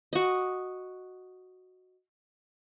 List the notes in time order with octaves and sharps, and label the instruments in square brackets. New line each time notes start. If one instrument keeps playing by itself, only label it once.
[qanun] F#4 D#5